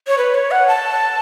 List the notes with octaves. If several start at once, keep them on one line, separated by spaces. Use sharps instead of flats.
C#5
B4
C#5
F#5
A5